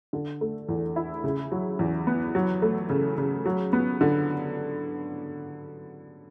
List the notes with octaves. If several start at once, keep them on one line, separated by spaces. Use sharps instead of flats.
D3
A3
E2
E4
C#3
F#3
E2
B3
F#3
A3
C#3
C#3
F#3
B3
D3